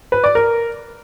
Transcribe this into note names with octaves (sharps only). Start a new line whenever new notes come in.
B4
D5
A#4